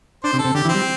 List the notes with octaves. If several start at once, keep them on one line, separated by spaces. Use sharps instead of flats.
D4 C5
C3
A4
C3
D3 G4
E3
C4
G3